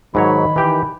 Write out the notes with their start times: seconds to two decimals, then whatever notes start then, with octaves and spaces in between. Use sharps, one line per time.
0.15 G#2 D#3 F#3 D#4 C#5 B5
0.56 E3 G4 G5